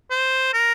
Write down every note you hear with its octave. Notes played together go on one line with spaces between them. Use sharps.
C5
A#4